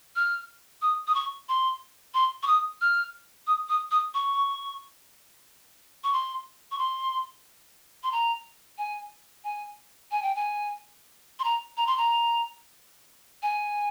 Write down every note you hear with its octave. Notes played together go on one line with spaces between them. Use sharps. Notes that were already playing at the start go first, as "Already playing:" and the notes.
F6
D#6
D#6
C#6
C6
C6
C#6
D#6
F6
D#6
D#6
D#6
C#6
C#6
C6
C#6
C6
C6
A#5
G#5
G#5
G#5
G5
G#5
C6
A#5
A#5
C6
A#5
G#5